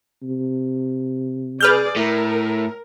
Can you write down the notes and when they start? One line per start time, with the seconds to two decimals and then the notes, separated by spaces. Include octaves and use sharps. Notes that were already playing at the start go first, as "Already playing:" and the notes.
0.23 C3
1.60 G#4 B4 D5 F6 G6
1.96 A2 A#4